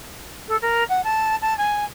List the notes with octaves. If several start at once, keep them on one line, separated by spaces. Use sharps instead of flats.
A4
A#4
F#5
A5
A5
G#5